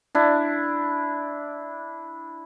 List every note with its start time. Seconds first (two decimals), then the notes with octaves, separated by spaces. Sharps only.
0.15 D4 E4